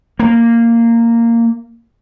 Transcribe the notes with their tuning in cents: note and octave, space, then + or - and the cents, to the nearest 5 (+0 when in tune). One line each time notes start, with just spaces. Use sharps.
A#3 -10